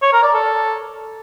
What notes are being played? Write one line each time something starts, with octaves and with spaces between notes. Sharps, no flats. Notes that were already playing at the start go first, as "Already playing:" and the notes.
C#5
A#4
D5
A4